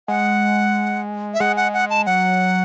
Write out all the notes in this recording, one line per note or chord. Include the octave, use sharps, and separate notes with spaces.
G#3 F#5
E5
G#3 F#5
F#5
F#5
A5
F#3 F#5